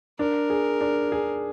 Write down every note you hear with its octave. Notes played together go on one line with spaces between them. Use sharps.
D4 A#4
G#4
D4
G#4